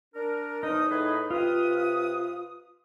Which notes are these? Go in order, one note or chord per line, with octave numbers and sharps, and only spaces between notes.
D4 A#4
E2 F3 D#4 D#6
A2 G#4 B4
C3 F4 B4 D#6